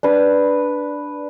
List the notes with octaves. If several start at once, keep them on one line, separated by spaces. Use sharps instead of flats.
D4 B4